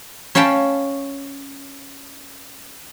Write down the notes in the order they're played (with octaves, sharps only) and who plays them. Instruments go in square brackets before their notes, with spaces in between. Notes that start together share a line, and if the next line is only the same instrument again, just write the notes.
[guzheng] C#4 C#5 F5 G5 A5 B5